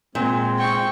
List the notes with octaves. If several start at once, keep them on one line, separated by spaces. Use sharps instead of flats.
A#2 G#3 C4
G5 C#6